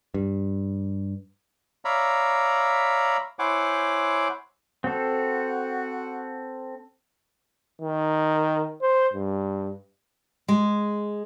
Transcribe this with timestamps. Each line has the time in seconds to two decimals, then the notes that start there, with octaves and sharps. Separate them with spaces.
0.14 G2
1.85 C#5 D5 E5 F5 A#5 B5
3.39 E4 C5 C#5 F#5 G#5 D6
4.84 C4 F#4 A4
7.82 D#3
8.82 C5
9.13 G2
10.48 G#3